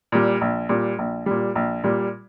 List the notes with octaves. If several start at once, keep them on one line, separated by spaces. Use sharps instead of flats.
A#2 G3
A#1
A#2 G3
A#1
A#2 G3
A#1
A#2 G3